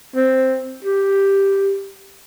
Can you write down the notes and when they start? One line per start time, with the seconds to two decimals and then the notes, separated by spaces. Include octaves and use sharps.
0.16 C4
0.84 G4